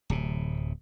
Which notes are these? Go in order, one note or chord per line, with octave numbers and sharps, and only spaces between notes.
D1 C3